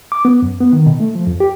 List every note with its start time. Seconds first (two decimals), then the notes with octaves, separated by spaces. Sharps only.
0.12 D6
0.25 B3
0.42 F#2
0.60 B3
0.73 D#3
0.86 B2
1.00 A3
1.15 F3
1.27 F2
1.40 G4